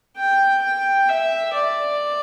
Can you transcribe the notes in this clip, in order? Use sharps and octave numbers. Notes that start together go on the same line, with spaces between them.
G5
G5
E5
D5